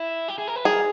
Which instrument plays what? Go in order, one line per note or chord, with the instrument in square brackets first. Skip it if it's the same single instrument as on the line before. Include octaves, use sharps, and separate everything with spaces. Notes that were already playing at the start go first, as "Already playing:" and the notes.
Already playing: [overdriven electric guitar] E4
G4
G#4
A#4
B4
[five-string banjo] G#4 [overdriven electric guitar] A#4